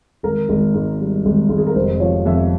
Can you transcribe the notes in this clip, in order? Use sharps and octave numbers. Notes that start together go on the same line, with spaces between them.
G#1 A#4
G#1
G#2
G3
G#1
G#1
G#4
A#4
F1 C5
F3 C#5
F2 E5